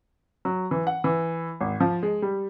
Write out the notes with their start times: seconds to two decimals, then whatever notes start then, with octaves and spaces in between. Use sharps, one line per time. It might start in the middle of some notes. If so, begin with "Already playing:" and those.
0.45 F#3
0.71 E3
0.87 F#5
1.04 E3
1.60 G#1
1.80 F3
2.03 G#3
2.22 G3